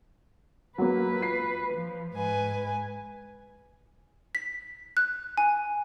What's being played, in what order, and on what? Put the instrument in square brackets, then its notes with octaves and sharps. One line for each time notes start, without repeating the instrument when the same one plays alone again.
[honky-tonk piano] F#3 A#3 [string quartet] B4
[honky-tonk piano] F4 C7
[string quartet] F3
G#2 B4 G#5
[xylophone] B6
F#6
G#5